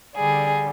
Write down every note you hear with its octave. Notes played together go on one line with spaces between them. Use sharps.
D3 G3 G#4